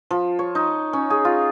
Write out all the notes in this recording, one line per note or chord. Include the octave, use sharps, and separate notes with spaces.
F3
C#5
D#4
C#4
G#4
F4